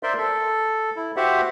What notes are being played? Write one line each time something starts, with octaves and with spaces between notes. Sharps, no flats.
A#4 C5 D5 E5 C6
A4
E4
F#4 G4 C5 E5 F#5